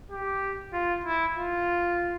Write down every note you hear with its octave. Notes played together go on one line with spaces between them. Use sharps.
G4
F4
E4
F4